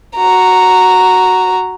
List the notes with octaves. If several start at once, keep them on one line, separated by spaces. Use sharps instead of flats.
F#4 A#5